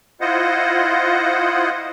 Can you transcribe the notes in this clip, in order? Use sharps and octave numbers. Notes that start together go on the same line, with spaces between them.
E4 F4 C5 D#5 F#5